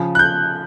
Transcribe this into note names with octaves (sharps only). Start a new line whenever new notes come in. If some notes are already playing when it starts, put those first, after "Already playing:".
Already playing: C#3 F3
F#6
G6